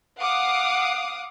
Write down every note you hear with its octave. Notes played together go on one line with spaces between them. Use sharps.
F5 F#5 D6 D#6